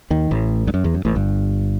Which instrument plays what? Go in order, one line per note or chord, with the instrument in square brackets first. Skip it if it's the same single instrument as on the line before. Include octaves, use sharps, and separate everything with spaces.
[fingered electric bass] D#2 D#3
A1 A2
G2
F#2
E2
F#2
A1 A2
G1 G2